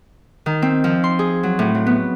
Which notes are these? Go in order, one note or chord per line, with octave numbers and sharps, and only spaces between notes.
D#3
C4
F3
C6
G#4
F#3
A2
F#3
B3